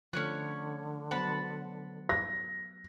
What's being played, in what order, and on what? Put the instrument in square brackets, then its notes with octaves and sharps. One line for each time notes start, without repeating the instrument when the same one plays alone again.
[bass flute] D3 [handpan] F3 A3 [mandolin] C#4 C#5 F#6
[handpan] F#3 B3 C5 [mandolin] F#5 A5 B5
[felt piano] A#6